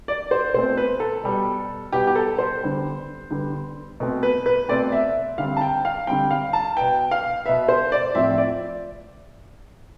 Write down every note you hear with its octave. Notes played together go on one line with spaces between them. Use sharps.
D5
C5
B2 A3 C4 C5
B4
A4
B2 G3 B3
B2 G3 B3 G4
G4
A4
C5
D3 G3 B3
D3 G3 B3
B2 A3 C4
B4
B4
B2 A3 C4 D5
E5
D3 G3 C4 F5
A5
G5
F5
D3 G3 C4 G5
F5
A5
B2 B3 G5
F5
B2 B3 E5
C5
D5
A2 F3 C4 E5
D5